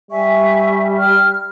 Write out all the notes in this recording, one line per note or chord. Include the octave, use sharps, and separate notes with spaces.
G3 E5 G#5 C#6
F6